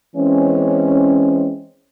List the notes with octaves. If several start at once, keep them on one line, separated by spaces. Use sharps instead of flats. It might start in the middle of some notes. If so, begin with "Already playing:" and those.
E3 G#3 C4 C#4